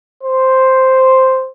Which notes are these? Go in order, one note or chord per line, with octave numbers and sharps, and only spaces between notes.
C5